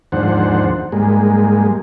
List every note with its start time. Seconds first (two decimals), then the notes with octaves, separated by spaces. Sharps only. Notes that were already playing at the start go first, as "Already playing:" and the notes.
0.12 D#2 G#2 F3 D4 C5 F#5
0.92 G#2 G3 G#3 A#3